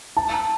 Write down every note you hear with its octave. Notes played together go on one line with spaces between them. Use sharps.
A5